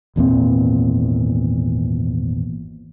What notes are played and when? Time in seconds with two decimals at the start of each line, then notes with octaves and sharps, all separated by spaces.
0.16 G#1 E2 A#2 C4